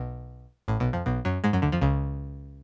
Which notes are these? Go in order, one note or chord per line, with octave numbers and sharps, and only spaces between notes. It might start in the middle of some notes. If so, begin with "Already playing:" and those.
Already playing: B1 B2
A1 A2
B1 B2
F2 F3
B1 B2
F#2 F#3
G#2 G#3
F#2 F#3
D2 D3
F2 F3
C#2 C#3